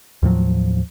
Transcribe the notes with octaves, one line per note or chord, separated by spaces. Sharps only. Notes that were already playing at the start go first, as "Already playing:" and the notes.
D#2 A2 F3 F#3